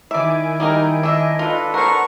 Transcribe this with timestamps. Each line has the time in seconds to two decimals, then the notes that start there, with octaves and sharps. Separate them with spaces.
0.11 D#3 E4 D5 E5 G#5 D7
0.60 G3 D#4 A#4
1.03 D4 D#5 E5
1.39 D4 F4 A4 B4
1.74 A#4 C5 F#5 A#5 C#6